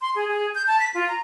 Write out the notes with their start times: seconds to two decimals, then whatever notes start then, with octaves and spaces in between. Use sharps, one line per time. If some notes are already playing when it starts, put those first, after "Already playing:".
0.01 C6
0.15 G#4
0.28 G#4
0.55 G6
0.67 A5
0.80 B6
0.94 F4
1.09 A#5